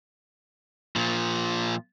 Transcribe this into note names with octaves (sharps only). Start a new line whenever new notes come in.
A#2 F3